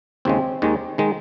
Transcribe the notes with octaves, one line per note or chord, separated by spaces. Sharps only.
D#2 C#3 G#3 C4
D#2 D#3 G#3
D#3 G#3